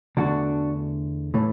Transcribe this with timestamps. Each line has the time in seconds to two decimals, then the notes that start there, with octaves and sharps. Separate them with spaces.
0.17 E2 D3 A3 D4 F#4
1.34 A2 E3 A3